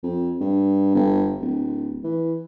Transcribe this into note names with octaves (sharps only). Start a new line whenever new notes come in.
F2
G2
G1
D1
E3